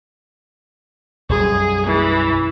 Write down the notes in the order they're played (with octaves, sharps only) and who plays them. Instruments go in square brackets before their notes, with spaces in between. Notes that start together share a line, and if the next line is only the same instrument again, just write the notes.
[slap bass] B1 F#2 G3 [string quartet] G#4
[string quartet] E3